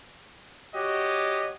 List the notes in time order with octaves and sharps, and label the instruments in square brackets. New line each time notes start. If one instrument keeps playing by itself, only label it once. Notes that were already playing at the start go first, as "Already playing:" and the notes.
[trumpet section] F#4 G4 C#5 D#5